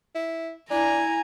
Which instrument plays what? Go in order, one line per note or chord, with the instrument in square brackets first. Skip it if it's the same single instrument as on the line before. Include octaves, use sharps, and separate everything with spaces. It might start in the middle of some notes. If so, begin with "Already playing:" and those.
[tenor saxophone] E4
[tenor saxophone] D4 [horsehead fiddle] E4 [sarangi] G#5 [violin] A#5